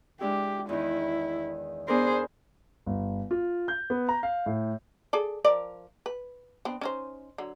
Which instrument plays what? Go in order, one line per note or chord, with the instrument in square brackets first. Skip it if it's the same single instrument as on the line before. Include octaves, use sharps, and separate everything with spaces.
[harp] G#3 D4 E4 [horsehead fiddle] G4
[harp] E2 D#3 [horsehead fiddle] E4
[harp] B3 D4 A#4 [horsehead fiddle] G#4 C5
[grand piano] G1
F4
G6
B3
A#5
F5
A2
[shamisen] G#4 A4 D5
F3 A#4 D5
B4
B3 C4 D4
C#4 D#4 C5
D3 F#3